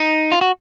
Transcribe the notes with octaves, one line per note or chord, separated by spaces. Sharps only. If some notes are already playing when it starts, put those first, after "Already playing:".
Already playing: D#4
F4
F#4